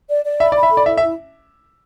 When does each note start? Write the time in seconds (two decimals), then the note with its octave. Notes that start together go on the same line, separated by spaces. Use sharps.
0.09 D5
0.24 D5
0.40 E5 B5
0.52 D5
0.56 B5
0.63 E5
0.71 A4
0.77 D5
0.86 E4 E5
0.97 E5
1.02 E4